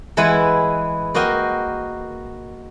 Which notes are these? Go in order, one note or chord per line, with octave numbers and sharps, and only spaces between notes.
E3 G#3 E4 B4 F#5 G#5
A#3 F#4 A#4 D#5 G5